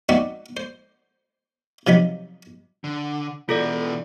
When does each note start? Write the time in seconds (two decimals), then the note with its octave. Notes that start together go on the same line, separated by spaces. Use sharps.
0.09 C4 D#4 F#4 D5 E5 F#5
0.57 C5
1.87 C3 F3 F#3 D#4 B5
2.84 D3
3.49 B2 E3 F4 A4 D5